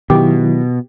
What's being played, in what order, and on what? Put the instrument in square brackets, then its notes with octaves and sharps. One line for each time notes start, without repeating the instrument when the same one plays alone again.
[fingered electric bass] B2 [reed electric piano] D#3 F#3 E4 [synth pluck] G4